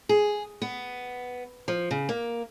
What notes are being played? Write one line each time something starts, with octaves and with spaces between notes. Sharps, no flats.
G#4
B3
F3
C#3
A#3